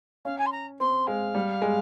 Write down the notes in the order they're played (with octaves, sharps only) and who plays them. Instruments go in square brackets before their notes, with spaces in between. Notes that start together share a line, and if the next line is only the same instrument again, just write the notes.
[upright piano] C#4 [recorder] F5
[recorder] G#5
C6
A#5
[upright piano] C4 [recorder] C6
[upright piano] G#3 [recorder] F5
[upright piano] G3
G#3